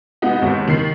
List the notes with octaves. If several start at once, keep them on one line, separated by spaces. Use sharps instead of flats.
C3 G#3 B3 D#4 F#4
D#2 G#2 B3
D#3 C7